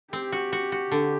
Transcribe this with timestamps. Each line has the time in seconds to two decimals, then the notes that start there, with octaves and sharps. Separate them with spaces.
0.13 C4 G4
0.32 F#4
0.52 F#4
0.72 F#4
0.92 D3